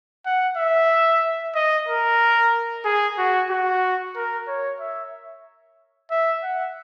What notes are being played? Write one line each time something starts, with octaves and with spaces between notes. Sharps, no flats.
F#5
E5
D#5
A#4
G#4
F#4
F#4
A#4
C#5
E5
E5
F#5